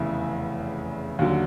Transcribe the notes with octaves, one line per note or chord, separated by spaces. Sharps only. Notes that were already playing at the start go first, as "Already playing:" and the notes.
Already playing: F1 E2 C#3 E4
D#2 D3 F#3